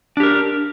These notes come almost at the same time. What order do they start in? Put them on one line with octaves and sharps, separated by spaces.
D4 G4 A#4